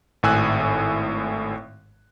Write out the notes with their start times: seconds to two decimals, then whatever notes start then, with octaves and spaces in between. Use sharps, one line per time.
0.23 G#1 A2 G#5 E6 F#6